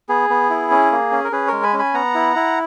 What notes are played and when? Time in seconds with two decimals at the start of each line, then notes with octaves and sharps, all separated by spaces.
0.09 B3 G#4
0.30 B3
0.50 E4
0.71 C#4
0.92 A#3
1.12 C#4
1.24 A#4
1.32 C#4 G#4 B4
1.47 G#3 A#4 C#5
1.63 G#5 B5
1.73 C#4
1.79 G#5 B5
1.94 B3 F#5 A#5
2.15 E4
2.36 E4